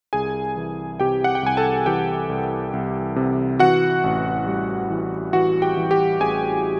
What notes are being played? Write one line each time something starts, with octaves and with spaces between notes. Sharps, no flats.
C2 G#4 G#5
E3
C3 G4 G5
F#5
G5
C2 G#5
A4 A5
E3 G4 G5
C2
C2
C3
E3 F#4 F#5
A1
G3
E3
E3 F#4 F#5
G4 G5
E3
G4 G5
A1 G#4 G#5